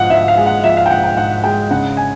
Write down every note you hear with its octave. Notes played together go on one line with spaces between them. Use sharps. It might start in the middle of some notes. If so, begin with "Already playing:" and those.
Already playing: G#2 F3 F5 F#5
G#2 E5
F5
G#3
F#5
F3 E5
F5
G5
G#2 F#5
G5
G#2 F#5
G#3 G5
C#3 F#5
G#5